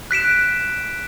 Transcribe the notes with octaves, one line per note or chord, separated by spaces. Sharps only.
F#6 B6 D7 E7